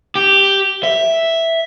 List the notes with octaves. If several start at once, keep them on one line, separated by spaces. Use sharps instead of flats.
G4
E5